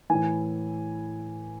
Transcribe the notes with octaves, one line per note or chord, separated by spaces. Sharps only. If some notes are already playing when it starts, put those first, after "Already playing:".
A2 E3 G#5